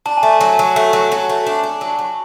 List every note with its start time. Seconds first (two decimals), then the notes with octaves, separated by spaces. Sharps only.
0.06 D4 A5
0.17 G#5
0.23 A3
0.41 F#3 G#5
0.59 F#3
0.76 A3
0.93 F#3
1.12 F#3
1.29 A3
1.46 D4
1.63 D4 A5
1.81 F#3
1.99 F#3